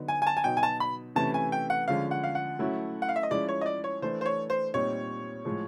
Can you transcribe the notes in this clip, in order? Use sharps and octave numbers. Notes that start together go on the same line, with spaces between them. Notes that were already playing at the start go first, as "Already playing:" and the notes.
Already playing: D3 F#3 B3 D#4
G#5
G#5
A5
G#5
B2 F#3 B3 D#4 G5
G#5
A5
B5
C3 E3 A3 C#4 E4 A5
G#5
G5
F#5
D3 F3 G#3 C#4 F5
F#5
F5
F#5
F#3 A3 C#4 E4
F#5
F5
E5
D#5
F3 G#3 C#4 E4 D5
C#5
D#5
D5
C#5
E3 A3 D4 C5
C5
C#5
C5
A#2 G3 C4 D#4 C#5
A2 F3 G#3